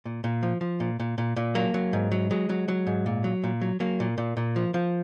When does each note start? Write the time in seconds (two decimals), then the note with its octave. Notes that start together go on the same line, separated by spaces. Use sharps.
0.05 A#2
0.24 A#2
0.43 F3
0.61 F3
0.80 A#2
1.00 A#2
1.18 A#2
1.36 A#2
1.55 F#3 A#3
1.74 F#3
1.93 G#2
2.12 F#3
2.31 F#3 G#3
2.49 F#3
2.68 F#3
2.87 G#2
3.06 A#2
3.24 F#3
3.44 A#2
3.61 F#3
3.80 F#3 A#3
4.00 A#2
4.18 A#2
4.37 A#2
4.56 F3
4.74 F3